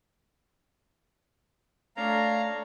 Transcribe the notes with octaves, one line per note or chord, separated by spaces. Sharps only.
A3 D4 C#5 F5 A#5